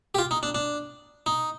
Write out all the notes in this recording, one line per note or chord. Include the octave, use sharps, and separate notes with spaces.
G4
F4
D#4
D4
D4
D#4